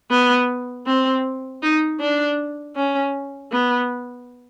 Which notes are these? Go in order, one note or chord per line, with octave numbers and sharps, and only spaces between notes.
B3
C4
D#4
D4
C#4
B3